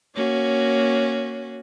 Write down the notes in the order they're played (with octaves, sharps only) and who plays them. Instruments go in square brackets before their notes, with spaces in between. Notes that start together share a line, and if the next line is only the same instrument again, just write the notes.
[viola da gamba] A#3 C#4 F#4